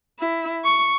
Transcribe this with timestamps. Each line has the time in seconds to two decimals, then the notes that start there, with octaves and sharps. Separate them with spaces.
0.19 E4
0.64 C#6